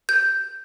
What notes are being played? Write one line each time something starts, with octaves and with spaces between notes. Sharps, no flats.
G6